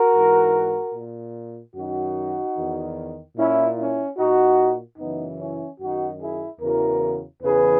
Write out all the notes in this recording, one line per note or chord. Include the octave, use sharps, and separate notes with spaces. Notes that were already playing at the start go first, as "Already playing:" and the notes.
Already playing: F#4 A#4
G#2 E3
A#2
F#2 D#3 D#4 F#4
E2 D#3
A#2 C#4 E4
C#4 E4
A#2 D#4 F#4
F#2 C#3 E3 B3 D#4
C#4 E4
F#2 D#3 D#4 F#4
E4 G#4
E2 C#3 E3 F#4 A#4
E2 C#3 E3 G#4 B4